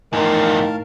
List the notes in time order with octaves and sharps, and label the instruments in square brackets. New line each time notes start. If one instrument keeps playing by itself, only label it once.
[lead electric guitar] E2 F3 [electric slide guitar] A2 D#4 [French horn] D#3 [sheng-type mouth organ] A#4 F5 A5